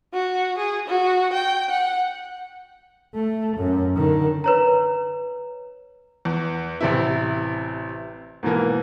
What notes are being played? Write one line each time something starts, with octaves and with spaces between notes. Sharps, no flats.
F#4
G#4
F#4
G5
F#5
A3
F#2
D3 D#3
B4 C#5 A#5
E2
A1 C3 E4
G#2 B2 E3 A#3